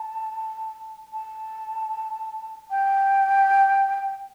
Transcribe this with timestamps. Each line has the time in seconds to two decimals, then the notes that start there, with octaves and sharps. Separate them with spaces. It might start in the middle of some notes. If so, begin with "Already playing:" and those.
Already playing: A5
1.13 A5
2.70 G5